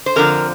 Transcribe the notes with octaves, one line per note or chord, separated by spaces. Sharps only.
C5
F2 D3 F3 A#4